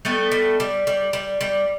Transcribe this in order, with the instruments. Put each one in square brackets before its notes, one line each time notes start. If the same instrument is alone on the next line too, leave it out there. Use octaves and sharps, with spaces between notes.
[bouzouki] G3 A3 B3
G3
G3
G3
G3
G3